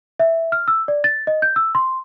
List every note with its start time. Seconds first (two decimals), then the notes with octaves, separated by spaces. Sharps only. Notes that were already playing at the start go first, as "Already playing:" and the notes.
0.20 E5
0.52 F6
0.68 E6
0.88 D5
1.04 A6
1.27 D#5
1.42 G6
1.56 E6
1.75 C6